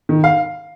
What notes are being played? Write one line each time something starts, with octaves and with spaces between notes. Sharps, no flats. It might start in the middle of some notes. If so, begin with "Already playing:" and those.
D#3
F5